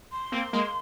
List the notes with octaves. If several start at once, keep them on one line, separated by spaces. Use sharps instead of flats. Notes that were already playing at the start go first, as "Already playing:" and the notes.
C6
A#3 C4
G#3 A#3